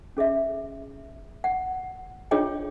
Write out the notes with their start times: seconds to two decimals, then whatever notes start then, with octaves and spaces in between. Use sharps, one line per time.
0.17 C#4 G#4 D#5 E5
1.44 F#5
2.31 D4 F4 G#4 C#5 D#5 G5